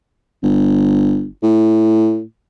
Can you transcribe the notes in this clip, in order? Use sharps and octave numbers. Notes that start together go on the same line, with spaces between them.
G1
A2